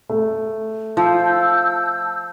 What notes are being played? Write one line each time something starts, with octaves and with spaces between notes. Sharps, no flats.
A3
F3 A5 E6 G6